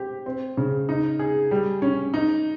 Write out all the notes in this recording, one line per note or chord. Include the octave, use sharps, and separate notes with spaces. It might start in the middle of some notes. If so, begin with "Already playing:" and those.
Already playing: C4 G4
C4
C#3
D#4
G#4
G3
C#4
D#4